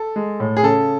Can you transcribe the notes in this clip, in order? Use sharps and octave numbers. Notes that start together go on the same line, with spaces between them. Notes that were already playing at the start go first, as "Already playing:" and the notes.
Already playing: A4
G#3
A2
G#4
C#3 A4